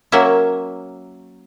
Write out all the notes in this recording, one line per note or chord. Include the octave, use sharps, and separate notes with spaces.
F#3 A#3 C#4 E5